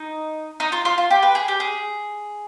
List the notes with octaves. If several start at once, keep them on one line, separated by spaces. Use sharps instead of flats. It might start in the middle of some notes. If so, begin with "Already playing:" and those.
Already playing: D#4
D#4
F4
F4
F4
G4
B4
G#4
G4
G#4